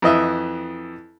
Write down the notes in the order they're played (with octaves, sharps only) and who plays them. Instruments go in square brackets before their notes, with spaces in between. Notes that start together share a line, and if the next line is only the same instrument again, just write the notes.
[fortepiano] F2 E3 D#5 E5